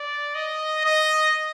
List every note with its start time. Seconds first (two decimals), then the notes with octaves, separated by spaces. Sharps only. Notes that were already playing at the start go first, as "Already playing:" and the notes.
Already playing: D5
0.35 D#5
0.85 D#5